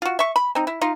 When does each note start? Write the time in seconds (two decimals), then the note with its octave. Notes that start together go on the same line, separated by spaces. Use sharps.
0.02 F4 F#4
0.19 E5 C#6
0.36 B5
0.55 C4 D#4
0.67 E4
0.81 D#4 F4